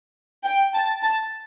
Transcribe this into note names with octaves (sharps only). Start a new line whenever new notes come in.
G5
A5
A5